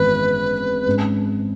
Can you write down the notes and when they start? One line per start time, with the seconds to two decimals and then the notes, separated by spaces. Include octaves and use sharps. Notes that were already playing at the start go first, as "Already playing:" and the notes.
Already playing: G#1 F#2 E3 G#3 B3 B4
0.87 G#2 G#3 C#4